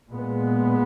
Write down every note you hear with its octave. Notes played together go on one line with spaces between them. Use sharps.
A#2 G#3 B3